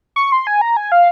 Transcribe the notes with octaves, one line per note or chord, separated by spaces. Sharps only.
C#6
C6
G#5
A#5
G#5
F5